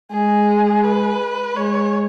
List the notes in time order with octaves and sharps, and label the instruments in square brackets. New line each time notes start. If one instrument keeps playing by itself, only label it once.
[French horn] G#3 [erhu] G#4
[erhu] B4
[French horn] G#3 [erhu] C#5